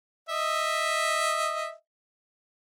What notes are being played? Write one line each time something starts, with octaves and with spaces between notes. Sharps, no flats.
D#5 E5